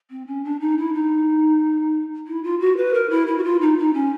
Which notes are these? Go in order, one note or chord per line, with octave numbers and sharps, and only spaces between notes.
C4
C#4
D4
D#4
E4
D#4
E4
F4
F#4
B4
A#4
E4
E4
F#4
F4
D#4
D#4
C#4